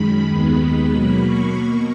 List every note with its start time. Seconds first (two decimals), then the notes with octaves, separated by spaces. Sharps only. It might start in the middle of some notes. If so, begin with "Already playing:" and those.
Already playing: F#2 D#3 G#3 B5
0.28 D#2 D#3 G#3 B3 B5
0.60 B5
0.92 B2 F#3 A#3
1.24 C#6
1.56 B2 A#3